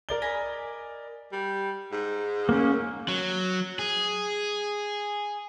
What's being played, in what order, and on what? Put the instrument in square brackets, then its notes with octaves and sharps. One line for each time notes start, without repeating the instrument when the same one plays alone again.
[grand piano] A#4 D5 G7
[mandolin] D#5 G#5 B5
[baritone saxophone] G3
G#2
[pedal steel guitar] A#3 C#4
[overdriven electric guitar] F#3
G#4